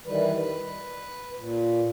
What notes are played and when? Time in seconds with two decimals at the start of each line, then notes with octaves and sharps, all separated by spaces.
0.07 D#3 E3 G3 B4
0.37 B4
1.38 A#2